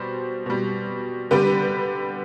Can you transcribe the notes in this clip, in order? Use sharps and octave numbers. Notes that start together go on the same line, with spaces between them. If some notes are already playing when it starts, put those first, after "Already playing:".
Already playing: B2 G3 C5
B2 G3
D3 G3 G4 B4